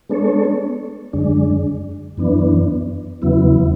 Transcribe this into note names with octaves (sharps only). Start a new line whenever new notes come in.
G#3 B3 D4 A4 C#5
F#2 D3 G#3 D4
F#2 E3 B3 D4
E2 C#3 F#3 B3 E4